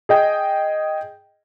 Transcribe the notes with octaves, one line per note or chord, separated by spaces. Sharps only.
G#4 D#5 G5